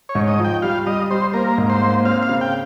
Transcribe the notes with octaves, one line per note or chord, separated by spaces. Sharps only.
C#5
G#2
D#5
F3
G5
G3 F5
G3 D#5
G3 C5
A#3 A#4
G#2
C5
A#3
C4 F5
F5
C#3
G5